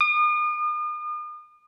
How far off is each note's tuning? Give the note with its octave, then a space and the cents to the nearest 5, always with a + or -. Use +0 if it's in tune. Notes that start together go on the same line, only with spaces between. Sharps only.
D#6 -40